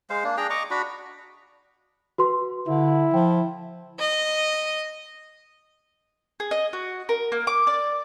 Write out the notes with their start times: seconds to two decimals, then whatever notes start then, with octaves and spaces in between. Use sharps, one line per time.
0.10 G#3 C5 F5
0.24 A#3 D4
0.37 D4 G#4 G5 A#5
0.50 D#5 A#5 C#6 D6
0.71 D4 F#4 B5
2.18 F#4 B4 C6
2.68 D3 E4
3.14 F3 G5
3.99 D#5
6.40 G#4
6.51 D#5
6.73 F#4
7.09 A#4
7.32 A#3
7.47 D6
7.67 D5